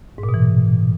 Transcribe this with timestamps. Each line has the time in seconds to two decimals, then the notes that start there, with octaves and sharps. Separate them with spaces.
0.18 G#2
0.23 A#2
0.29 B2
0.34 E3